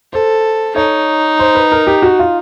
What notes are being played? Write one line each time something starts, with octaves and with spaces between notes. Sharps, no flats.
A4 C5
D#4 C#5
C5
B4
A#4
G4
F#4
F4